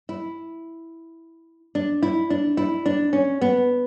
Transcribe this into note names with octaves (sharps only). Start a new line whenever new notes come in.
E4
D4
E4
D4
E4
D4
C#4
B3